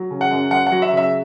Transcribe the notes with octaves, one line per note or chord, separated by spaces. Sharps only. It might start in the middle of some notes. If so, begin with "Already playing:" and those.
Already playing: F#3
C#3
F#5
F#2
F#2 F#5
F#5
F#3
E5
C#3 E5